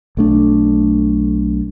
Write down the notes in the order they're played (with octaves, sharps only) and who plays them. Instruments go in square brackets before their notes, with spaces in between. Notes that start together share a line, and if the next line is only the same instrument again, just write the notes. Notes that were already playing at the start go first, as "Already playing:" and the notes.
[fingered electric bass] B1 A3 D4